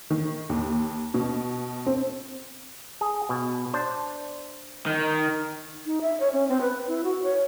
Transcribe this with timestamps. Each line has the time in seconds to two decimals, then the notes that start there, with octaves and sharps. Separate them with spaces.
0.10 D#3
0.49 D#2
1.14 B2
1.86 C4
3.01 G#4
3.29 B2
3.73 D4 C5
4.87 D#3
5.86 D#4
6.01 E5
6.20 C#5
6.33 C#4
6.48 C4
6.61 B4
6.87 E4
7.04 F#4
7.23 C#5